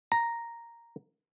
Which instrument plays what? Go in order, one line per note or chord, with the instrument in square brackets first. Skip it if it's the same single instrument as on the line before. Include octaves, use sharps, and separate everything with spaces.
[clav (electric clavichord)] A#5